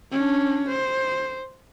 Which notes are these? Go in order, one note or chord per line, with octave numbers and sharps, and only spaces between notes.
C#4 D4
C5